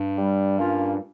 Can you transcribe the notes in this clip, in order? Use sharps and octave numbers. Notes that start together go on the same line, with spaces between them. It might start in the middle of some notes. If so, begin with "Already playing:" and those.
Already playing: G2
G3
A#3 C#4 F4